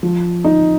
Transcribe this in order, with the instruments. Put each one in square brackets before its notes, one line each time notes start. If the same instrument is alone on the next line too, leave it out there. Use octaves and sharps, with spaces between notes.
[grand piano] F3
D#4